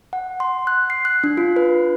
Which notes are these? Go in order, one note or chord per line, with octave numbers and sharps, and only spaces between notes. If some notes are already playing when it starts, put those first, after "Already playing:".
F#5
C6
F#6
C7
F#6
D4
F4
B4